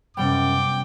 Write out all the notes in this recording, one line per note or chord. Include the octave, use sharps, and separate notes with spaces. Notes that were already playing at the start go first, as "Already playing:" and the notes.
F#2 C3 G3 B3 G5 D6